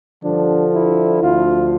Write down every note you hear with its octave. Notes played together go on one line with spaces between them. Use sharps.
G2 D3 F3 D4
E4
D2 D3 F3 F4